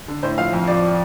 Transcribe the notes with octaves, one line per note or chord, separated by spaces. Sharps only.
D3
A2 C5
F3 F5
F2
F3 D5